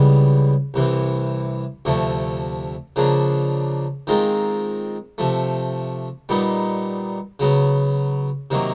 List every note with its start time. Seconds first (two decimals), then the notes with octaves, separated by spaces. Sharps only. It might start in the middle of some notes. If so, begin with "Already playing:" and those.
Already playing: C#2 C#3 E3 G3 B3
0.74 C2 C3 E3
1.85 D2 C3 F3 A3
2.96 C#3 F3 A#3 D4
4.07 D#3 G#3 C4 F4 A#4
5.18 C3 F3 A3
6.29 A#2 G3 B3 D#4
7.40 C#3 F#3 B3
8.50 C3 D#3 F#3 A#3